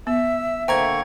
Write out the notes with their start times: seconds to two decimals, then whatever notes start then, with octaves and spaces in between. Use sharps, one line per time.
0.07 B3 E5 E6
0.68 D3 A#3 C5 G5 A#5 C#6 G#6